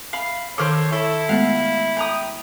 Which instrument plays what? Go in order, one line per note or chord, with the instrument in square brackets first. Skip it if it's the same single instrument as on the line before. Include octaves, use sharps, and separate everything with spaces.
[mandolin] F5 B5
[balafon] D#3 D6 [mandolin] A4 A#4 C5 [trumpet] C#5
[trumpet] E4 [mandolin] A4
[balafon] G#3 A3 B3 [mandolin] F5
[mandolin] G5 A#5 D#6